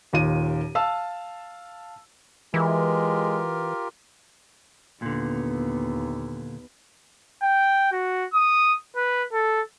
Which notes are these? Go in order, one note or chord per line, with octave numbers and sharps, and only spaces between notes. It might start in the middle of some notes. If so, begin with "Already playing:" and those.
D#1 D#2 F4 D#7
F5 A5 E6
E3 G#3 F4 G4 A#4
D#2 A#2 D3 B3
G5
F#4
D#6
B4
A4